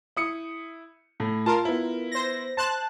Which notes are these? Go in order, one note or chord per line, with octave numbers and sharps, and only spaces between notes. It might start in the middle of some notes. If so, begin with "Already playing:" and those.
E4 D#6 C#7
A2
F4 A#4 A5 C6
B3 E4
C5 A#6
C5 A5 C6 F#6